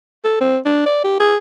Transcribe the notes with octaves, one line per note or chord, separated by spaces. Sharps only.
A4
C4
D4
D5
G4
G#4